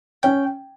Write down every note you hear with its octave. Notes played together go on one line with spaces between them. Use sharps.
C#4 G5